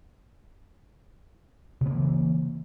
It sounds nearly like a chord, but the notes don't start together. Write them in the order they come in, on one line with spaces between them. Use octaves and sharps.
C#3 B3 A#3 E3